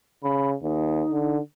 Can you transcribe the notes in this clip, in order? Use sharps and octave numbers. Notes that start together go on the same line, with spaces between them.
C#3 B5
D#2 D#4
D3